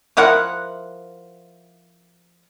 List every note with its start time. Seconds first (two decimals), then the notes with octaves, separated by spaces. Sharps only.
0.17 F3 E4 A#4 F#5